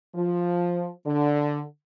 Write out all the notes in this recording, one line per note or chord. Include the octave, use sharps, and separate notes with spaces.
F3
D3